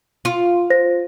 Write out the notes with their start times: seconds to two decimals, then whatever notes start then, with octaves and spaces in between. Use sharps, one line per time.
0.25 F4
0.70 C5 A#6